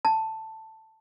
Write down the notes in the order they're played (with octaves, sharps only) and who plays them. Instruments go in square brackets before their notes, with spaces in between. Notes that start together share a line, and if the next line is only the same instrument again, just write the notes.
[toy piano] A5